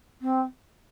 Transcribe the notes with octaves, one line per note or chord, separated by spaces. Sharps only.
C4